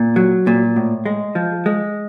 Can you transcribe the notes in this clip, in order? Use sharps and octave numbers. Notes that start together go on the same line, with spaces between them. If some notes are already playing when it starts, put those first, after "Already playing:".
Already playing: A#2
F#3
A#2
A2
G#3
F3
G#3